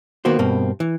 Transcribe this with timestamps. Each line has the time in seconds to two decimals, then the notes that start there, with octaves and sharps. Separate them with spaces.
0.25 D#3 A#3 B3 F#4 C5
0.39 G2 B2 A#3 C4
0.80 E3